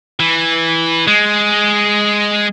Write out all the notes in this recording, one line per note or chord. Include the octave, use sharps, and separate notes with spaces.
E3
G#3